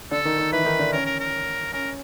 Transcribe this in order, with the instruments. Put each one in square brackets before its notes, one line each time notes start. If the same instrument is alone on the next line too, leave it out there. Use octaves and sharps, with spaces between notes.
[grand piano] D3 D4 [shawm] A4
[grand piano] D#3 D#4
D#3 D#4
[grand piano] E3 E4 [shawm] B4
[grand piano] D#3 D#4
D3 D4
[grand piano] C#4 [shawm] A#4
[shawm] A#4
A#4
[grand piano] C#4 [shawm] A#4